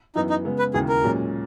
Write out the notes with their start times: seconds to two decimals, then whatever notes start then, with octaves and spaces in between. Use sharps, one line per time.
0.15 F#2 E3 B3 D#4
0.30 D#4
0.45 C#3 G#3 B3
0.59 B4
0.74 E1 D#2 C#3 E3 G#4
0.89 A#4
1.04 B1 A#2 G#3 C#4